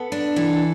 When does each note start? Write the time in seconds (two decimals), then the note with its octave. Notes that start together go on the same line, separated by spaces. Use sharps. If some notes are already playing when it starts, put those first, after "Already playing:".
Already playing: B3 A4
0.12 D4
0.36 E3 A4